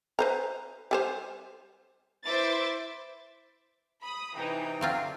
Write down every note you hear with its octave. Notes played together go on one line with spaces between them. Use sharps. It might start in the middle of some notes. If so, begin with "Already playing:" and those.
B4 C5 A#5
G3 G#4 C5
E4 B4 C5 E5 D6 A6
B5 D#6
C3 E3 D#4 G5
D3 F#3 C4 F4 F5